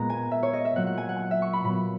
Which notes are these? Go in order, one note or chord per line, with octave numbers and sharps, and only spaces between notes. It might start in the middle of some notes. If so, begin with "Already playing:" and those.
Already playing: A#2 G#3 B3 A#5
G#5
E5
C#5
D#5
E5
A#2 F#3 A#3 F#5
F#5
G#5
F#5
G#5
E5
C#6
B5
A#2 F#3 B3 B5